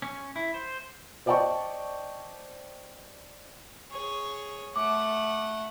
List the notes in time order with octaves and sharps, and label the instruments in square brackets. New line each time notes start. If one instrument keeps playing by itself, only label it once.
[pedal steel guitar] C#4
E4
C5
[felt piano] C5 D5 D#5 G5 A5 C#6
[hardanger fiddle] G#4 C#5
[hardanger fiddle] A3 F#5 [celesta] D6